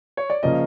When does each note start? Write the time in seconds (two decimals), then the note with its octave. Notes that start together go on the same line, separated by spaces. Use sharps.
0.17 C#5
0.30 D5
0.43 C#3 F3 A#3 C#4 D#5